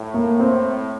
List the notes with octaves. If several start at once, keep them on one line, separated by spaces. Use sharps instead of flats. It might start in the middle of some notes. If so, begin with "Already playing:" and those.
Already playing: A2
A#3
C4